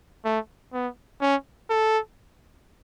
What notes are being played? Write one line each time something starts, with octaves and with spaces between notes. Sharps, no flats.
A3
B3
C#4
A4